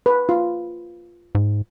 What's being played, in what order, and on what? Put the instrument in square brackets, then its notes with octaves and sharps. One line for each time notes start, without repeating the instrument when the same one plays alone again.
[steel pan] B4
F4
[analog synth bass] G#2